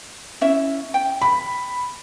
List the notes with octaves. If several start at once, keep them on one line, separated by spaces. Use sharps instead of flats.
C#4 E4 E5
G5
B5